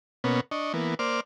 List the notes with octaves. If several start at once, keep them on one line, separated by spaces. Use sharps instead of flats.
B2 A#3 B3 C#4
D4 D#5 C#6
E3 A#3 B3
A#3 C5 D5 D6 F6